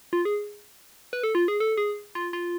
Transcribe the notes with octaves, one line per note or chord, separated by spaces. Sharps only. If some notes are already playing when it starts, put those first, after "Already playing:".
F4
G#4
B4
A4
F4
G#4
A4
G#4
F4
F4